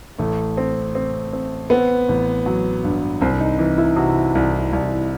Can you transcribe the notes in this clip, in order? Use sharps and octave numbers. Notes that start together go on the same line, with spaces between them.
A1 A3
C4
C4
C4
B3 C4
A1
F#3
G2
C2 C4
D#4
E3
E4
C3 F#4
C2
C2